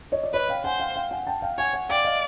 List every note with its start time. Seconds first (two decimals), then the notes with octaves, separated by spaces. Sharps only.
0.12 C#5 D#5
0.24 D5
0.33 B4 C#5 D#5
0.49 F5 G5
0.64 C5 F#5 G#5
0.80 F5 G5
0.96 F5 G5
1.11 F#5 G#5
1.27 G5 A5
1.42 F5 G5
1.58 C#5 F#5 G#5
1.73 F#5 G#5
1.89 D5 F5 G5
2.05 D#5 F5